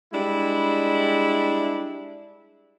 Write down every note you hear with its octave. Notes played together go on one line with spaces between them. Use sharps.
G3 G#3 D4 E4